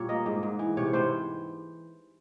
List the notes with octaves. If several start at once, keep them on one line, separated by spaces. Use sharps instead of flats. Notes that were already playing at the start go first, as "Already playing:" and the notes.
Already playing: A#2 G3 C#5
A#3 D#5
G#2
G#2
E3
C3 C#5
C3 C5